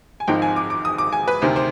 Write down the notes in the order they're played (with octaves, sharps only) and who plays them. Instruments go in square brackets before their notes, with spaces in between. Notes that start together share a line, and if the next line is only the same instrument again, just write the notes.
[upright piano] G#5
G#1 G#2 F3 C4 D#4 G5
G#5
D6
D6
D#6
D6
G#5
B4
D2 C3 D#3 C5
C5